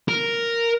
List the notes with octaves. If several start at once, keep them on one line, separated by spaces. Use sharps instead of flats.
A#4